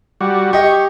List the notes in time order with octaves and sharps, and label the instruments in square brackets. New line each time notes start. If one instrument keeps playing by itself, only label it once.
[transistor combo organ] G3 F#4
[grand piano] G4 D#5 [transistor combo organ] C#6